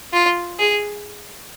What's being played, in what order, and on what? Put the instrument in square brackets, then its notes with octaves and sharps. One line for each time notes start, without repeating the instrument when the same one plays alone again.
[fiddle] F4
G#4